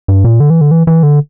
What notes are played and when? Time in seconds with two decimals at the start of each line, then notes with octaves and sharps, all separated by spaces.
0.08 G2
0.24 A#2
0.40 D3
0.50 E3
0.61 D3
0.71 E3
0.87 E3
1.03 D3